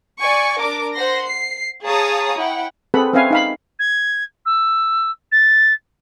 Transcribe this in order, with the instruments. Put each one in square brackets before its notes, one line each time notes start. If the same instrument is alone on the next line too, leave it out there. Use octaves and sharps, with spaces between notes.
[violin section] D5 G#5 C#6
D4 A#4 D6
C5 F#5 C6 A#6
C7
G#4 C#5 F5 A5 A#5 D#6
E4 F#5 G5
[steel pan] C4 G#4 A4 B4 F#5 B5
C4 C#4 B4 E5 F5 G#5
D#4 F5 B5
[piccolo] G#6
E6
A6